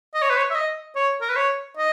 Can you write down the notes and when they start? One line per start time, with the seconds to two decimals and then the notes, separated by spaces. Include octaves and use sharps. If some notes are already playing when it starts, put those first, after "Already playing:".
0.14 D#5
0.22 C#5
0.30 B4
0.37 C#5
0.51 E5
0.55 D#5
0.96 C#5
1.21 A#4
1.29 B4
1.36 C#5
1.77 D#5